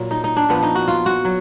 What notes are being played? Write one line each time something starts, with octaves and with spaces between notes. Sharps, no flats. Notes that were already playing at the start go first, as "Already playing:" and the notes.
Already playing: A#2 F#3
D#4
D#4
D4
A#2 F3 B3
D#4
F#4
F4
F#4
F#3